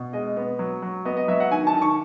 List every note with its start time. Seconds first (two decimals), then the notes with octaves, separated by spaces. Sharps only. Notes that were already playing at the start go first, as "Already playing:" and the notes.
Already playing: B2
0.13 G#3 D#5
0.37 B3
0.59 F#3
0.82 F#3
1.05 B3 D#5
1.17 D#5
1.28 F#3 E5
1.40 F#5
1.51 D#3 G#5
1.67 A5
1.74 D#3
1.82 C#6